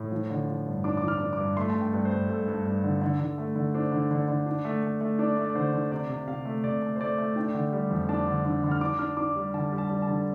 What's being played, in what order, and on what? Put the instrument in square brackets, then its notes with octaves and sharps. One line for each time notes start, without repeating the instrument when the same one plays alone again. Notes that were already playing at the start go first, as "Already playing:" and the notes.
Already playing: [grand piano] A2
F3
D3
F3
G2
D4 D6
D6
F3
F6
D4
D6
G2
A3 C6
A5
G2
G5
G2
C5
G2
G2 A4
G2
G2
D3
D3
D3
A3
D3
D4 C5
D3
D3
D3
D4
A3
A3
A3
D4 D5
A3
D5
D3 C5
D3
C3 D5
C3
C3 F5
A3
C3 D5
A3
C5
A3 D5
A3
D4 G5
D3
G3
F2
D4 A5
D3
D3
D3
F6
D4 D6
D4 F6
D4 D6
G3
D3 A5
G3
A5
G3
A5
D3